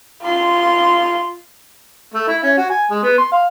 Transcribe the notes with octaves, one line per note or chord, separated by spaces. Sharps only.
F4 C6
A3
E4
C#4
F#4
G#5
G#3
B3
C6
F5